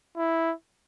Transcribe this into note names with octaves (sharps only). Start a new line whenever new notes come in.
E4